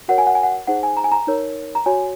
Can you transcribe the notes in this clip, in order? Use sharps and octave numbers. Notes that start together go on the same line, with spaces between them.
F#4 A#4 C#5 F#5
G#5
F#5
G#5
F#5
D#4 G#4 C5 F#5
G#5
A#5
G#5
A#5
D#4 A#4 C#5
A#5
F#4 C#5 G#5